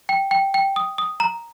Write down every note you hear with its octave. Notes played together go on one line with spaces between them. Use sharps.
G5
G5
G5
D#6
D#6
A#5